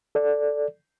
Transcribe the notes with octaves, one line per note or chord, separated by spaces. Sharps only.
A4 D5